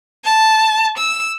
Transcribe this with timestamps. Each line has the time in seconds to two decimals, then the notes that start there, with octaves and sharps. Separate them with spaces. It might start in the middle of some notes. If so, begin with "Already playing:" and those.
0.24 A5
0.97 E6